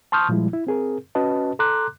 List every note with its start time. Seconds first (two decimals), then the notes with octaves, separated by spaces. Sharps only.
0.12 A5 C6 C#6 D#6 F6 G6
0.29 A#2 F3 G3 G#3 E4
0.53 E4
0.67 C4 G#4 A#4
1.15 C#4 F#4 B4 D#5 A5
1.59 A4 A#5 C6 D6 F#6